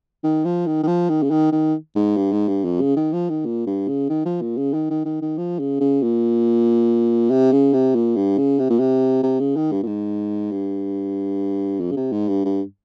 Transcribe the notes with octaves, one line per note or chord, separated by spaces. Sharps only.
D#3
F3
D#3
D#3
F3
D#3
C#3
D#3
D#3
G#2
G2
G#2
G2
F2
C#3
D#3
F3
D#3
A#2
G2
C#3
D#3
F3
A#2
C#3
D#3
D#3
D#3
D#3
F3
C#3
C#3
A#2
C3
C#3
C3
A#2
G2
C#3
C3
A#2
C3
C3
C#3
D#3
G2
A#2
G#2
G2
F2
C#3
C3
G#2
G2
G2